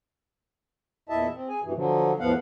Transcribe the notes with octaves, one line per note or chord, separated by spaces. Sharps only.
E2 A#2 E4 D#5 E5 A5
C4
G#4 G#5
G2 B2 E3
D3 F3 F#3
E2 A2 F3 B3 F5 F#5